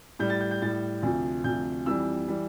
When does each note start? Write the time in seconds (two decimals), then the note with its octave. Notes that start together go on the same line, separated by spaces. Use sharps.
0.19 A2 G3 G6
0.30 A6
0.41 G6
0.51 G6
0.62 A2 G3 A6
1.03 D2 C3 F3
1.44 D2 C3 F3 G6
1.86 F2 E3 G3 E6
2.28 E3 G3